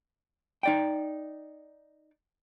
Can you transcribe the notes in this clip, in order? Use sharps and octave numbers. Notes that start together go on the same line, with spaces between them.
D#4 D5 G5